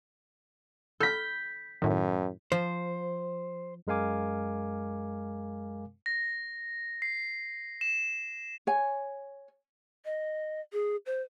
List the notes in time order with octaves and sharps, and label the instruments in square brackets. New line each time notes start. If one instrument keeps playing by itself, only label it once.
[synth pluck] A4 F6 [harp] G6 B6
[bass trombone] F#2 [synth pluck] A2 D#3
[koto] F3 [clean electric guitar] C5
[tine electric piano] F#2 G#3 A#4 F5 G#5 D6
[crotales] A#6
C7
E7
[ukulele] C#5 G#5
[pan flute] D#5
G#4
C5